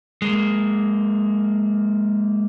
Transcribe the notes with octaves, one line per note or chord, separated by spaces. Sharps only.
G#3 A#3